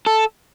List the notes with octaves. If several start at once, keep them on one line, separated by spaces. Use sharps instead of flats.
A4